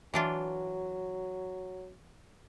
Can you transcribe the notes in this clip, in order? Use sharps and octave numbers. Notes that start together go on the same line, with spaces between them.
E3 F#3 D4 F4